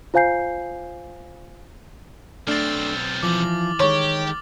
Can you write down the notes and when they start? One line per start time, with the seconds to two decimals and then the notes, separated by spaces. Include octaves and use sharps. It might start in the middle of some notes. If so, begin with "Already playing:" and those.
0.14 F4 C5 F5 G#5 G6 C7
2.47 B1 A3 C4 D4 F6 A6
3.23 E3 F3 D6 F#7
3.80 D#3 G#3 G4 C#5